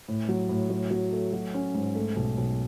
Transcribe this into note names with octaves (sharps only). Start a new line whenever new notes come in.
A2
F#3
A2
F#3
F#3
A3
F#3
C#4
G#2
A3
B1
B1